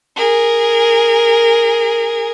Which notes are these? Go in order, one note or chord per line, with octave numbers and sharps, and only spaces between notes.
G#4 A#4